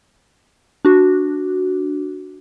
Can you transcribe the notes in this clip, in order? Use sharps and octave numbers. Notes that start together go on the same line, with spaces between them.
D4 F#4